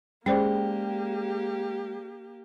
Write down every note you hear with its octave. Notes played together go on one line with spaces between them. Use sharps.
G#3 A#3 C#4 G4 G#4 C5 D5 G5